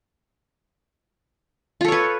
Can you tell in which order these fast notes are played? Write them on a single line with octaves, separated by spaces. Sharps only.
F4 A4 C#5 B4